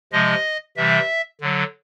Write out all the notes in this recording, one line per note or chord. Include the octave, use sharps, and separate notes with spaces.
C3 F3 G#3 D#5
C3 E3 G3 E5
D3 F#3